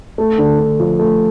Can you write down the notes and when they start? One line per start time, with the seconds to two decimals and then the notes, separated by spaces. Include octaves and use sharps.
0.18 A3
0.38 D3
0.59 D3
0.80 F3
0.99 A3